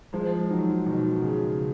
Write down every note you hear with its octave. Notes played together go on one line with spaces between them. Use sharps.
F3 G#3
D#3 F#3
B2 D#3
C#3